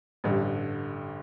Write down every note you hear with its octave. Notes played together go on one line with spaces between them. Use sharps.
A1 G2 D3